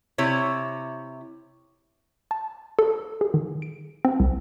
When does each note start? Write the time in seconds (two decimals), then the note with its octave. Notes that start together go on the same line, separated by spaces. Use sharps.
0.18 C3 E4 C#5
2.31 A5
2.79 A4
3.21 G#4
3.34 D#3
3.62 D7
4.05 C4
4.20 C2